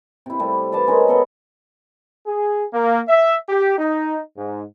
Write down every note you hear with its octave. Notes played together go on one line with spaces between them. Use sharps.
C3 E4
C3 G3 A3
B4 D5 F5 A5
G#3 C#4 A#4 B4
B3 A4 D#5
G#4
A#3
E5
G4
D#4
G#2